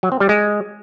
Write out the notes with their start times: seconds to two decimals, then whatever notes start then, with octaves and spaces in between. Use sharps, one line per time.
0.03 F#3
0.12 C4
0.20 G3
0.29 G#3